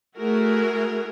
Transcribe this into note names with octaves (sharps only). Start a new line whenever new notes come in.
A3 E4 F#4 G#4 A#4